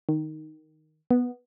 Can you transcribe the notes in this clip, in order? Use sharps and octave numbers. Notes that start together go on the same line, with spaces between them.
D#3
B3